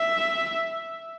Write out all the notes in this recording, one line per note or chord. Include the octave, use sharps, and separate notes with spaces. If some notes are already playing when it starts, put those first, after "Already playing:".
Already playing: E5